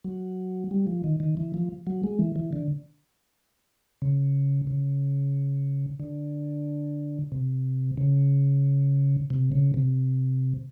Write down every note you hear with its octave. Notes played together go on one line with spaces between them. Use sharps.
F#3
G3
F3
D#3
D#3
E3
F3
F#3
G#3
E3
E3
D3
C#3
C#3
D3
C3
C#3
C3
C#3
C3